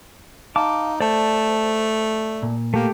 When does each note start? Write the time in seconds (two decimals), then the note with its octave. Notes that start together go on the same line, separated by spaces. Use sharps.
0.56 D#4 F5 A5 D6
1.01 A3 C5 D5 A5
2.43 A#2
2.74 A3 A#3 G4